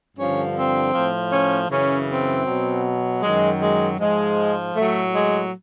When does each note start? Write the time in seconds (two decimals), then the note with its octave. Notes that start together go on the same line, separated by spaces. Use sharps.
0.16 G2 D3 F3 C#4
0.55 C4
0.93 A2 F3
1.32 C#4
1.69 F#2 C#3 E3 C#4
2.09 C4
2.46 B2 F#3
3.22 F#2 D#3 F#3 G#3
3.61 G#3
3.99 G#2 F3 G#3
4.75 A2 F#3 A3
5.14 G#3